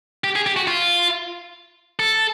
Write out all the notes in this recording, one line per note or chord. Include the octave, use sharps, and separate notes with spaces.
G4
G#4
G4
F#4
F4
A4